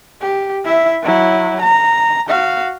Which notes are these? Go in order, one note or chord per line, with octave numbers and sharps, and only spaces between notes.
G4
E4 E5
F#3 E4
A#5
F#4 F5